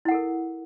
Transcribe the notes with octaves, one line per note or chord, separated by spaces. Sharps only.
E4 A4 A#4 F#5